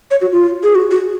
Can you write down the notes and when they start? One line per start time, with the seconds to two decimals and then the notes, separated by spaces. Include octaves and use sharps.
0.11 C#5
0.22 F#4
0.32 F4
0.63 G#4
0.75 F#4
0.91 F#4